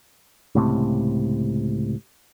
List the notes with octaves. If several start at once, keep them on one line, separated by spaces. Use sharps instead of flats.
C#2 A2 C3